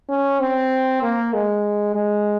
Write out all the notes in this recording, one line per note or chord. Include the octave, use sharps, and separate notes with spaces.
C#4
C4
A#3
G#3
G#3